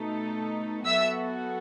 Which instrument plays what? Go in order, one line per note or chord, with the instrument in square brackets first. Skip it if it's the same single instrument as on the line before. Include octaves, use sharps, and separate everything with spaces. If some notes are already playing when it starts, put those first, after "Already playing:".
Already playing: [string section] B2 A3 D#4 A4
[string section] F#3 B3 F#4 A4 [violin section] E5 E6